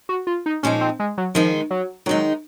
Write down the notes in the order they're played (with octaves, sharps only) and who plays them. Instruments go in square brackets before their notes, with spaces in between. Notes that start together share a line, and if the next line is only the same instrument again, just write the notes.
[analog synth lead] F#4
F4
D#4
[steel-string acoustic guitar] A#2 F3 G#3 D#4 [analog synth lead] C#4
[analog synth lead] C4
G#3
F#3
[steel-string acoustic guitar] D#3 G#3 D#4 [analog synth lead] F3
[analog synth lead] F#3
[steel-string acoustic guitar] D#3 G#3 D#4 [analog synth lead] F#3